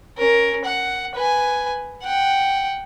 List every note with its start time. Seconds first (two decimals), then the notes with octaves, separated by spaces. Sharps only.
0.18 C#4 A#4
0.65 F#5
1.15 B4 G#5
2.03 F#5 G5